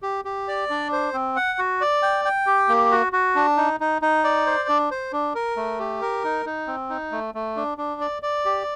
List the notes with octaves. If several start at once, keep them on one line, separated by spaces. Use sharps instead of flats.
G4
G4
D5
D4
C5
C4
F#5
F#4
D5
G5
G5
G4
A#3
F#4
F#4
D4
D#4
D#4
D#4
D5
C5
D4
C5
D4
A#4
A3
G4
A#4
D#4
D#4
C4
D#4
A3
A3
D4
D4
D5
D5
G4